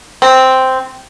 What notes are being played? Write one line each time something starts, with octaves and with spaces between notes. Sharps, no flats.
C4